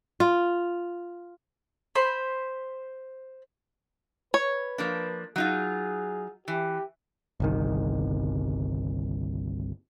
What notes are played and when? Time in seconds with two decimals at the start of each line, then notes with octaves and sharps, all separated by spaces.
0.20 F4
1.95 C5 B5
4.34 B4 C#5
4.78 F3 A#3 D4
5.36 F#3 D#4 F4 G#4
6.48 E3 G4
7.40 G1 C2 D#3